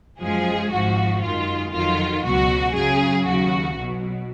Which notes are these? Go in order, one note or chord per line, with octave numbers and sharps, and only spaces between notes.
F#2 F3 G#3 G#4
G#1 G#2 F3 F#4
F#2 D#3 G#3 F4
F2 D#3 F#3 F4
C#2 B2 F#3 F#4
F#2 C#3 F#3 G#4
D#2 C#3 F#3 F#4
B1 B2 F#3